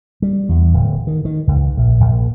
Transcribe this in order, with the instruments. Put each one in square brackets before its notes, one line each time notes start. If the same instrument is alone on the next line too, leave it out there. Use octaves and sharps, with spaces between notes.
[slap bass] G3
E2
D1
D#3
D#3
C#2
A#1
A#1